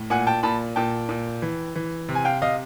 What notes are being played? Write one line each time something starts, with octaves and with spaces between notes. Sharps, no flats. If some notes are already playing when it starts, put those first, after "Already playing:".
Already playing: A2
A#2 F#5 G#5
G5 A5
A#2 A5 B5
A#2 G5 A5
A#2
E3
E3
C3
G#5
F5 G5
C3 D#5 F5